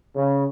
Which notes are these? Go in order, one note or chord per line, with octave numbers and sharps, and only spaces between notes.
C#3